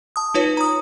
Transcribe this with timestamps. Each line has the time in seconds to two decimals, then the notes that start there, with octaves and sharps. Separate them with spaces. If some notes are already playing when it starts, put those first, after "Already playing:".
0.16 A5 D#6
0.34 D#4 F4 B4 C#5
0.57 A#5 D#6